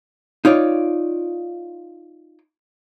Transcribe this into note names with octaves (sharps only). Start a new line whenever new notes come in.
D#4 F4 C#5 D5